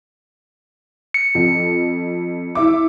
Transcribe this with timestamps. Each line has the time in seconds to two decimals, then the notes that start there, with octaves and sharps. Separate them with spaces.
1.14 C#7
1.35 F2
2.55 E4 E5 D6